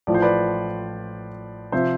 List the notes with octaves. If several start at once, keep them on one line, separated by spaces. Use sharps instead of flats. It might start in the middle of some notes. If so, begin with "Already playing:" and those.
A1 A2 F3 A3 D5
C5
B4 D5
C3 F3 C5 E5